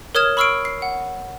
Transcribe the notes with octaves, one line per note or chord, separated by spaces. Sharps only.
A#4 C#5 D#6 F6 G#6 E7
B5 C#6 E6 F6 C7 D7
C7
F#5